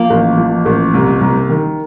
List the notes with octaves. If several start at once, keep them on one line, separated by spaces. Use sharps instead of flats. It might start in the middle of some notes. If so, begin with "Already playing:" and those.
Already playing: F3 A#3
A1
F3
A1
C2
C2
D#3